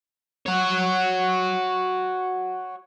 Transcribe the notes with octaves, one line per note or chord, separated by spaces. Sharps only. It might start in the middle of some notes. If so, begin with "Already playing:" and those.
F#4 C#5